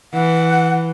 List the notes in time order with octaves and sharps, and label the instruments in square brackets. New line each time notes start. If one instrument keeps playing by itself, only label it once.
[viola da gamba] E3 [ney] F#5